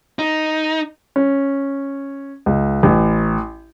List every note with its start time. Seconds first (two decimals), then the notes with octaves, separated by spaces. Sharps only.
0.19 D#4
1.16 C#4
2.46 C#2
2.83 A1